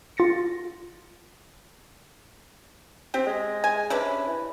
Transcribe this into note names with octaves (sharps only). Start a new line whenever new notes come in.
F4 A6 A#6 C#7
C4 G4
G#3
G#5
C3 C#4 D4 B4
E3